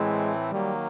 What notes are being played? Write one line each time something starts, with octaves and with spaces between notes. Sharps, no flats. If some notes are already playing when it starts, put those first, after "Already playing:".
Already playing: A2 E3 G#3 A3 C4 E4
D#3 F#3 G3 A#3